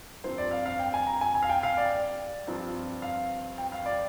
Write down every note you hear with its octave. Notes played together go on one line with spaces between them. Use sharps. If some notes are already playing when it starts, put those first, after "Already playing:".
G2 F3 C4 C5
D5
F5
F5
G5
G#5
A#5
G#5
G#5
F5
G5
F5
D5
G2 F3 C4
F5
G5
F5
D5